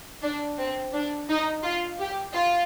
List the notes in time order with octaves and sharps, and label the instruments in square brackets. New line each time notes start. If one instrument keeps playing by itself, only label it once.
[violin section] D4
C4
D4
D#4
F4
G4
F4